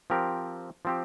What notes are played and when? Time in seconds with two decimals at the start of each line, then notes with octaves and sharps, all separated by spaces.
0.10 F3 C4 G4 A#4
0.85 F3 C4 G4